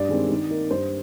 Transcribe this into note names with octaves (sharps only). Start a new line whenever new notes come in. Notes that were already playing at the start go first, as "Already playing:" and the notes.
Already playing: G2 D5
D#3 G#3 C4
D#3
A#3 D#4
G2 C5